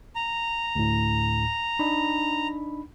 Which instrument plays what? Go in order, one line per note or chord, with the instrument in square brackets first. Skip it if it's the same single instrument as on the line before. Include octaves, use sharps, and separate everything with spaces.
[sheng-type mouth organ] A#5
[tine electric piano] D2 A2
D4 D#4 B5